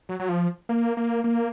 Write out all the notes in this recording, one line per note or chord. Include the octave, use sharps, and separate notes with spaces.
F#3
F#3
F3
A#3
A#3
A#3